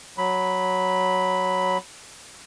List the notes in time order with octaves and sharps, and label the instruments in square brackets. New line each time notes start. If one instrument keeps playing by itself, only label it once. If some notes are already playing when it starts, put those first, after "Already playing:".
[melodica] F#3 B5